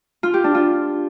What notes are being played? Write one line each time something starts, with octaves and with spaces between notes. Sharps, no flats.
F4
G4
D4
F4